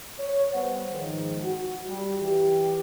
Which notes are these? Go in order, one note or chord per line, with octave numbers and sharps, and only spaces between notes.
C#5
G3 B3 B4 C5 F#5
G#2 D#3 F3
F#4
G3
E3 G4